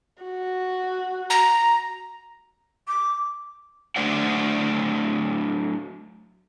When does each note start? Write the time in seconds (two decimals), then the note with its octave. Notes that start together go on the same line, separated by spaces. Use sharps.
0.22 F#4
1.30 A#5
2.88 D6
3.96 F#3 A3 D4 C5 D5 F#5